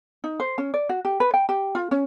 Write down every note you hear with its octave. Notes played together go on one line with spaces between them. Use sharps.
D#4
C5
C#4
D5
F#4
G4
B4
G5
G4
F4
C#4